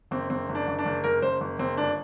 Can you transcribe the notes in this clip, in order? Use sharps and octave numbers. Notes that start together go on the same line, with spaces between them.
F#1 C4
F#1 C4
F#1
D4
F#1
D4
F#1
F#1 A#4
F#1 C5
F#1
F#1 C4
G1 D4